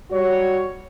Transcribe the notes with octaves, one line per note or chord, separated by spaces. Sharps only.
G3 F#4 C#5